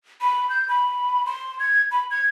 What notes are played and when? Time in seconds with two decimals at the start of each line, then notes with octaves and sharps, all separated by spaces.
0.21 B5
0.50 G6
0.68 B5
1.26 C6
1.60 G#6
1.91 B5
2.11 G#6